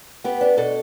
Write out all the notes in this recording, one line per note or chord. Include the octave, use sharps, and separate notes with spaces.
B3 G4
D4
B2 A4